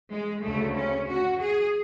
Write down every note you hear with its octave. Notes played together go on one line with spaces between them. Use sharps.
G#3
D2 C#3 A3
C#4
F#4
G#4